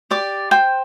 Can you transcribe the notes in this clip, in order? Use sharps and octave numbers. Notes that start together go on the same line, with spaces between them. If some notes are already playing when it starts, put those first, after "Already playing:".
G4 D5 D6
C5 G5